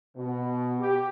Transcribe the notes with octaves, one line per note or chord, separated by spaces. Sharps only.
B2
G4